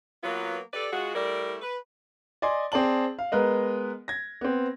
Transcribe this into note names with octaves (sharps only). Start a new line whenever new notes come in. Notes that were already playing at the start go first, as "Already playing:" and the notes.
F#3 A#3 B3 F4 B4
G4 A4 B4 D5
G#3 F4 F#4
G3 A3 E4 A#4 D5
B4
D5 D#5 G#5 C6
C4 G#4 D5 A5 F#7
F5
G#3 B3 A#4 B4 D#5
G#6 A#6
B3 C4